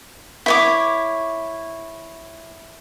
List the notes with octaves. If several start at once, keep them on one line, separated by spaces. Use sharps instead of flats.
E4 C#5 D6